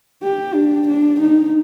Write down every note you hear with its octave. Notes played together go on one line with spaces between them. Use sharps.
G4
D4
D4
D#4